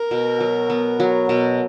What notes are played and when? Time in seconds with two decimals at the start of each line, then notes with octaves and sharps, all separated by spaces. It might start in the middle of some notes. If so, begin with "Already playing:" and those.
Already playing: A#4
0.11 B2
0.40 F#3
0.70 B3
1.00 F#3
1.28 B2 A#4